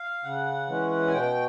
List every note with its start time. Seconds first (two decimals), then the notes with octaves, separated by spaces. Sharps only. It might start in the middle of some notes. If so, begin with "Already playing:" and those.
Already playing: F5
0.24 C#3 F#5
0.68 E3 G#3 C#4
1.07 G#5
1.13 B2 G5